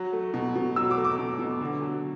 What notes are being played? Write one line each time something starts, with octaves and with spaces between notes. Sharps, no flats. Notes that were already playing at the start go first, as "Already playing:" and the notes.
Already playing: F#3
A3
B2
B2
F#3 E6
D6
A3
D6
B2
B2
D3
F#3